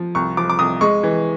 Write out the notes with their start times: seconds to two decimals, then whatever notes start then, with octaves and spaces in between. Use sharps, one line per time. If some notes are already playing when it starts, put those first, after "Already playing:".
Already playing: F3
0.15 C2 C#6
0.37 F3 D6
0.50 D6
0.59 C2 D#6
0.81 G#3 C#6
1.03 E3